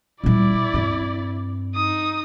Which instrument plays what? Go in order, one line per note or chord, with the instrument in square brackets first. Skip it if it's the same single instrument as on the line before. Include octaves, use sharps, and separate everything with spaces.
[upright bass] A#2 G3 [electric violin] E4 D5
[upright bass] G2 C4
[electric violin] D#4 D#6